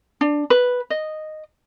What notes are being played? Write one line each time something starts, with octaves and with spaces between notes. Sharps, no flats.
D4
B4
D#5